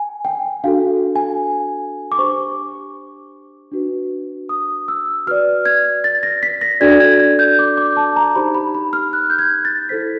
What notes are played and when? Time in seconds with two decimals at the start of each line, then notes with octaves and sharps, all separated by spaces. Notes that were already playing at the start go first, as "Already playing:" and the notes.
Already playing: G#5
0.25 G5
0.64 D4 F#4 A4 F5
1.16 G#5
2.12 D6
2.18 D4 G4 C5 C#6
3.72 D4 F#4 B4
4.49 D#6
4.88 E6
5.27 F#4 B4 D5 F6
5.66 G#6
6.04 A6
6.23 A#6
6.43 B6
6.61 A#6
6.81 D4 F#4 A4 D5 G#6
7.00 G#6
7.20 G#6
7.39 G6
7.59 D6
7.77 D6
7.97 A5
8.16 A#5
8.35 D#4 G4 C5 B5
8.54 B5
8.74 B5
8.93 F6
9.13 F#6
9.30 G6
9.39 G#6
9.65 A6
9.89 E4 A4 C5 B6